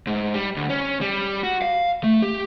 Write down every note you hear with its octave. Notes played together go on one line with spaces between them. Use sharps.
G#2
G3
D2
C#4
G3
F#4
F5
A3
G4